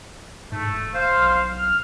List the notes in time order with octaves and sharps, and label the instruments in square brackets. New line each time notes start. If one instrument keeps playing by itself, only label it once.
[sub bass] G#2 [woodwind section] A3
[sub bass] E1
[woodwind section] C5 F5
[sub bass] B1
[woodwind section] F6